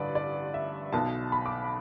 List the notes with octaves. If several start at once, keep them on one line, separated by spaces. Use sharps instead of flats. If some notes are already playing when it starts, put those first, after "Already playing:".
Already playing: A1 G2 D3 B4 D5
D5
E5
B1 B2 B3 A5
B5
D6